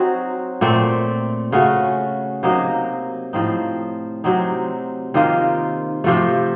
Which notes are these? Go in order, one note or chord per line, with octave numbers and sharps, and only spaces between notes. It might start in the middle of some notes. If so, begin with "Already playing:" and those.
Already playing: F#3 C4 D#4 F#4
A#2 A3 C4
C#3 A3 C#4 F#4
C3 F#3 A#3 D#4
A2 F3 C4 D#4
C3 F#3 C4 D#4
C3 D#3 A#3 F4
C3 F3 A3